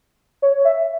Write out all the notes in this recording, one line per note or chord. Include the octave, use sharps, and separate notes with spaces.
C#5
E5